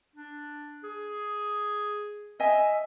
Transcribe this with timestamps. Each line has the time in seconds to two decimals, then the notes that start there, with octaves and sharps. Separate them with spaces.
0.16 D4
0.84 G#4
2.40 D#5 E5 G#5